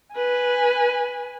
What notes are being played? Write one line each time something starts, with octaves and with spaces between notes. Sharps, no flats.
B4 G#5